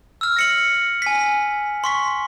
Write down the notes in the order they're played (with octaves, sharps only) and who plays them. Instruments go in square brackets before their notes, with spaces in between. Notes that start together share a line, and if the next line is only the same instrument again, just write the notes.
[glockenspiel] E6 F6
A#6 C#7 F#7
G#5 B6
C6 C#6 B6